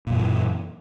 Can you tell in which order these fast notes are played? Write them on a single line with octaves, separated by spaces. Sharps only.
A#2 F#2 D3 E3